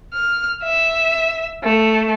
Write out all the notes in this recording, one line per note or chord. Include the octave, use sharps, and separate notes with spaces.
F6
E5
A3